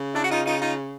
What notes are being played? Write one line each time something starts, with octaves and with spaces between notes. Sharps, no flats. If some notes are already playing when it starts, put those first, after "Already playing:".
Already playing: C#3
D4 E4
F#4
D#4 F4
D#4 F4
D#4 F4